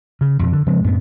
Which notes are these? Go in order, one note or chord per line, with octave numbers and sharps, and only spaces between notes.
C#3
F2 B2
D3
C#3 F3 G#3 C4
F#2 A2 B3 C4